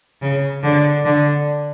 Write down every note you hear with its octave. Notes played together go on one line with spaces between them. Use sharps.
C#3
D3
D3